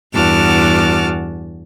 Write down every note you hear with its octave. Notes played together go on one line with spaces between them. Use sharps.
E2 G2 F#4 A5 D6 F6